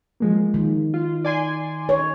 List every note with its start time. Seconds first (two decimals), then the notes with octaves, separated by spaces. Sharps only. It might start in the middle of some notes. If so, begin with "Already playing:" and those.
0.20 F3 G#3 A#3
0.54 D#3
0.94 F4
1.25 D5 G#5 C6
1.89 C#5